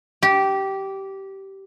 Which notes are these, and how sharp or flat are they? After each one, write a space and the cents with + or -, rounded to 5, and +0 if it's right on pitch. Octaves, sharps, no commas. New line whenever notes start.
G4 -15